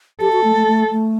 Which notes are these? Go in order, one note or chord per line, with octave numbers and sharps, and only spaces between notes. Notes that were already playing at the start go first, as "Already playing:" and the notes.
G4 A4
F#4
A3
A3
A3
A3